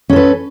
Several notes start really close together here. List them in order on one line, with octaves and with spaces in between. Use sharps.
C#4 A4 B4